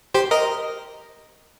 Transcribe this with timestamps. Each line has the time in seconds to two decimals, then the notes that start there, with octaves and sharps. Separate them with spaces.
0.14 G4 C5
0.31 A#4 D#5